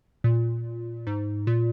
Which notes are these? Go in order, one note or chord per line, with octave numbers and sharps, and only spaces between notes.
A#2
G#2
A#2